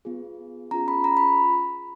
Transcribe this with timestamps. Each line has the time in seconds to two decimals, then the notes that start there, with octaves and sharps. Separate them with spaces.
0.05 B3 F4 G#4
0.71 C#4 F4 G#4 A#5
0.88 B5
1.04 A#5
1.17 B5